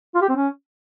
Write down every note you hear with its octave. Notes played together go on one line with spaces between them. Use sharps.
F4
G4
C4
C#4